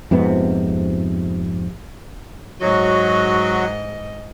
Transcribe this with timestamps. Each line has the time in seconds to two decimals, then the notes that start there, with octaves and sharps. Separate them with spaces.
0.11 F2 G#2 C3 B3
2.61 G#2 F#3 F#4 D#5